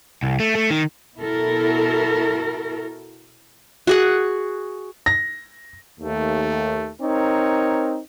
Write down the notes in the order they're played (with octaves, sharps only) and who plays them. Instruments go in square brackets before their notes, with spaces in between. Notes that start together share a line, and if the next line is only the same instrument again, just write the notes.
[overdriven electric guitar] C2
A3
A3
D#3
[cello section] B2 E4 F#4 A4 A#4
[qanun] F#4 G#4 F#5
[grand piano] A#6
[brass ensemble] D#2 A3
C4 D#4 A#4 C#5